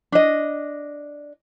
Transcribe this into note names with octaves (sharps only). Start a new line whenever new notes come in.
D4 D#5